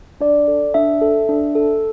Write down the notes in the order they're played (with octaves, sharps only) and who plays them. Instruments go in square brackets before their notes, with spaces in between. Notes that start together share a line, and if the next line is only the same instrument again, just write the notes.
[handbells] D4 D5
A4
D4 E5
A4
D4
A4